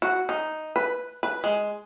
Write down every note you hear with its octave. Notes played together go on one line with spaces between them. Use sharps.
F#4
D#4
B4
B4
G#3